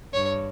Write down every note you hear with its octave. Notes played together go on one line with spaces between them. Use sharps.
G2 C#5